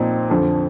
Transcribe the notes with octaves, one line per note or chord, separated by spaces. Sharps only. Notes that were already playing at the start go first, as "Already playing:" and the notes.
Already playing: A#2 F3 C4 D#4
F2 D3 F3